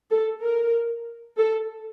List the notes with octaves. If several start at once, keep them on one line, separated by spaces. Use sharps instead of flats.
A4
A#4
A4